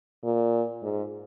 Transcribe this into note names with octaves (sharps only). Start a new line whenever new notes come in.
A#2
G#2